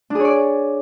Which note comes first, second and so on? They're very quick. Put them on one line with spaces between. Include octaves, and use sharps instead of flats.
D4 G#4 C#5 D5